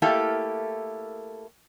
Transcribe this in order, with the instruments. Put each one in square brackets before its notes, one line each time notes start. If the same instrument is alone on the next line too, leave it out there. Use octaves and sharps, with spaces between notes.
[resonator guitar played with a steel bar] A3 A#3 E4 G4 A4 A#4